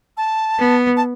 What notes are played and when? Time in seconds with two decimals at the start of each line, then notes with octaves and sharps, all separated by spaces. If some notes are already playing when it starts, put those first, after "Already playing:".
0.17 A5
0.59 B3
0.97 A5